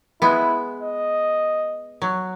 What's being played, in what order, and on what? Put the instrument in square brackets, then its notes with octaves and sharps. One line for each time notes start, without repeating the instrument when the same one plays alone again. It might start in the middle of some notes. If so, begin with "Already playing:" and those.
[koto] G#3 B3 [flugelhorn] E4
[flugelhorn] D#5
[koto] F#3